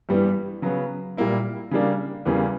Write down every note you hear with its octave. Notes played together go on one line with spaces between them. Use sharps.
G2 E3 G3 B3
C#3 F#3 B3
A#2 G3 A#3 E4
C#3 G3 A#3 D4
E2 C#3 E3 G3 A#3